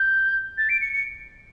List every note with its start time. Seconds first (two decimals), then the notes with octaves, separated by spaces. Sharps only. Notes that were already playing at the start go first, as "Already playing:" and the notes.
Already playing: G6
0.57 A6
0.69 D7
0.81 C#7
0.93 C#7